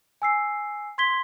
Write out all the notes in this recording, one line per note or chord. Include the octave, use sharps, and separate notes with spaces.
G#5 E6 C7
C6 G#6 B6 G7